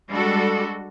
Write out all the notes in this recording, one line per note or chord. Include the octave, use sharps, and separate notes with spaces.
G3 G#3 D4 F#4 A4 D5